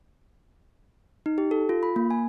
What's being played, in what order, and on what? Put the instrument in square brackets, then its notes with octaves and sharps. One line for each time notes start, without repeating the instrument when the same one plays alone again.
[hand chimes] D#4
G4
A4
F4
B5
A#3
G#5